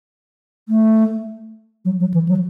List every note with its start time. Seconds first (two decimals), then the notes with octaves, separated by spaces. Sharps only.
0.69 A3
1.85 F#3
2.00 F#3
2.14 E3
2.29 F#3